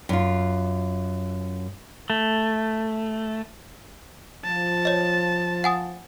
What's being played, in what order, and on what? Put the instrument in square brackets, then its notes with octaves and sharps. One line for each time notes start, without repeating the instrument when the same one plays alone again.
[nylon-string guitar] F#2 F4
[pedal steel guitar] A3
[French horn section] F3 [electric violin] A5
[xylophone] C#5 D#5
F#5 G#5 D#6